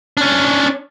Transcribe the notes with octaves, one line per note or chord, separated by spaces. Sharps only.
C#4 D4